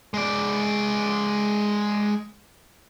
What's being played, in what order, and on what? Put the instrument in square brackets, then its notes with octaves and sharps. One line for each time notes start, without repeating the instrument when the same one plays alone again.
[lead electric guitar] G#3 D5